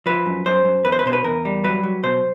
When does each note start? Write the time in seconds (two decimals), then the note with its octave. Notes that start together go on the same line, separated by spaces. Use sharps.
0.06 F3 B4
0.26 F#2
0.46 F#2 C5
0.65 F#2
0.85 E2 B4
0.92 C5
0.99 B4
1.06 B2 C5
1.13 B4
1.24 E2 A#4
1.45 G3
1.64 F#3 B4
1.83 F#3
2.03 B2 C5